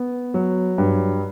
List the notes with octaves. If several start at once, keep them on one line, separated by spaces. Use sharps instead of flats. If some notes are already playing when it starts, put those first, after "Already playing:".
Already playing: B3
F#3
G2